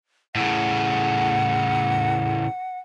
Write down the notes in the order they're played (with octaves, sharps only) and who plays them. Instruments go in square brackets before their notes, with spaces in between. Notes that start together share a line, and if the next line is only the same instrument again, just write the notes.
[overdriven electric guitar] A2 C#3 [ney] F#5